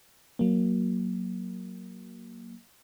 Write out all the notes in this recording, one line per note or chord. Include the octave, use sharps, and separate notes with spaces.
F#3 A#3